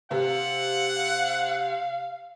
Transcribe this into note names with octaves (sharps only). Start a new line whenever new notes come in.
C3 F5 F#5